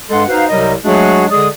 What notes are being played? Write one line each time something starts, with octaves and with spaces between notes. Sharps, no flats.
G2 G#3 A4 F#5 C6
D#4 F#4 B4 C5 F5
C2 C3 F#3 G3 A#4 D#5
F#3 G#3 A3 D4 F#4 G#4
D3 G#3 G#4 D5 D#6